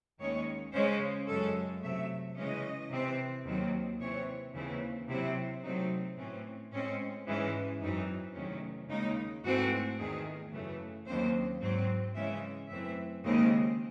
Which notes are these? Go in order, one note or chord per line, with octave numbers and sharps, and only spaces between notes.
D#2 D#3 G#3 C#4 C#5
C#3 G#3 C#4 C5
F#2 C#3 G#3 C#4 A4
C3 F#3 A3 E5
C#3 E3 G#3 C#4 D#5
C3 E3 C4
D#2 D#3 F#3 C4
C3 E3 C4 C#5
D#2 C#3 E3 C4 E4
C3 F#3 C4 E4
C3 F#3 A3 C4 D#4
A2 E3 C4 C#4
A2 G#3 C4 C#4
G#2 E3 G#3 C#4
F#2 E3 C4 D#4
E2 C3 D#3 F#3 A3 C#4
D#2 C#3 G#3 D#4
G#2 E3 A3 C4 F#4
E2 D#3 A3 G#4
F#2 C#3 E3 A3
D#2 C#3 F#3 C4 C5
G#2 F#3 C4
C#3 E3 G#3 C#4 E5
F#2 E3 A3 C4 E5
D#2 C#3 G#3 C4 D#5